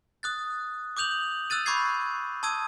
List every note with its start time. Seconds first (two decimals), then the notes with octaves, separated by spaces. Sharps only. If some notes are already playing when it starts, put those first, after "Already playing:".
0.23 D#6 F#6 A6
0.97 D6 D#6 G6 F7 F#7
1.50 E6 F#6 A6 D#7
1.66 B5 C#6 D6 G6 G#6 C7
2.43 A5 D#6 E6 G#6 D#7